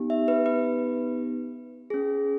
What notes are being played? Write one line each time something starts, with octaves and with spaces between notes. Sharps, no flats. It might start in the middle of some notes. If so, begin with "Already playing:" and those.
Already playing: B3 D#4 G4
E5
B4
B4
C#4 G#4